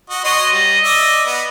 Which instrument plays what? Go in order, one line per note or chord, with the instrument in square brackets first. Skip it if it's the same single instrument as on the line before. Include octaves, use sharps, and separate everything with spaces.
[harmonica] F#4 D#5
[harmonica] F#4 C#5 C6 [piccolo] D#5
[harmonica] G3
D5 E5
B3